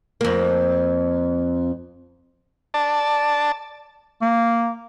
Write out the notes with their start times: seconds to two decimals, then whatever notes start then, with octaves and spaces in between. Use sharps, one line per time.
0.21 F2 A#3
2.74 D5 A5
4.22 A#3